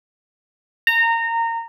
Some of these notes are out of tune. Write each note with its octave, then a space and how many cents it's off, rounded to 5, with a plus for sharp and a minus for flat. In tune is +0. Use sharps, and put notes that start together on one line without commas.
A#5 -20